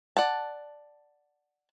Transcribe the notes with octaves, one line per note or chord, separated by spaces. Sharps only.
D5 F#5 A5